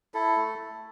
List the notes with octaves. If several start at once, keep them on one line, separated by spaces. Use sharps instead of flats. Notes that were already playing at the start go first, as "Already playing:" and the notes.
E4 A4
A3